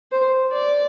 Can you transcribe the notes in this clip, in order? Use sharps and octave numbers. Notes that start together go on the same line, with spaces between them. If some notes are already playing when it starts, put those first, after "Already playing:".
C5
D5